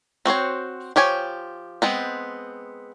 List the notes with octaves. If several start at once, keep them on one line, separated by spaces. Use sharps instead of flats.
C4 F#4 C5 C#5
F3 G4 C#5 G#5
G#3 B3 C4